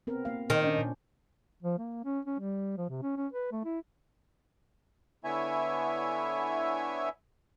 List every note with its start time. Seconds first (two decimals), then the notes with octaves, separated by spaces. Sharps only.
0.07 B3 C4 A#4
0.25 A#3 F5
0.50 A#2 D#3 C5
0.64 C#4 D4 D5
0.78 A#2
1.63 F3
1.78 A#3
2.05 C#4
2.25 C#4
2.40 G3
2.77 F3
2.89 C3
3.02 C#4
3.17 C#4
3.33 B4
3.52 A3
3.64 E4
5.24 D3 B3 E4 C#5 E5 G#5